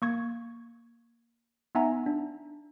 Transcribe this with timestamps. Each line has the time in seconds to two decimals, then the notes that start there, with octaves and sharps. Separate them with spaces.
0.02 A#3 C#6 G#6
1.75 B3 D#4 E5 F#5 G#5 A#5
2.06 D4